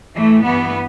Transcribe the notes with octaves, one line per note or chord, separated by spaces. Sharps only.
A2 E3 A3
G2 E3 B3